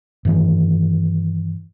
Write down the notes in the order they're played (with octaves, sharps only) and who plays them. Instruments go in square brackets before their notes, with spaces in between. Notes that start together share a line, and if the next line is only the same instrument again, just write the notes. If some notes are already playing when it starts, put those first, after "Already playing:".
[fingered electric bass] G2 D#3 E3